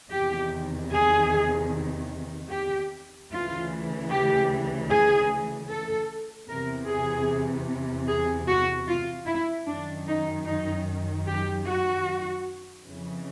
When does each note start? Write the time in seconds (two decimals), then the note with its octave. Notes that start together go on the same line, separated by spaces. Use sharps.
0.12 E2 C3 D#3 G4
0.93 G#4
2.51 G4
3.31 D2 C#3 E3 F4
4.10 G4
4.90 G#4
5.70 A4
6.48 E2 C3 E3 A#4
6.88 G#4
8.08 G#4
8.48 F#4
8.88 F4
9.27 E4
9.67 F#2 D#3 D4
10.07 D#4
10.46 D#4
11.27 G4
11.66 F#4
12.86 F2 C#3 E3